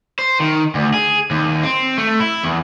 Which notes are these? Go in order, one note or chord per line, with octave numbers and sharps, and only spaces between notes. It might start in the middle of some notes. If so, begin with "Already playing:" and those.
C5
D#3
D2
G#4
D#2
C4
A3
E4
E2